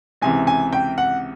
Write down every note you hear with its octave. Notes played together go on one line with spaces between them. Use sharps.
C#2 C3 E3 G#5
G#5
G5
F#5